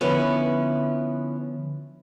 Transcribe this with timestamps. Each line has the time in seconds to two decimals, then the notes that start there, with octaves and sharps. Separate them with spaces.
0.01 D3 F3 B3 C#4 E4 B4